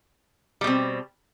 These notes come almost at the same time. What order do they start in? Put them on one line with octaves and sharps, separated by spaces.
G3 B2 C4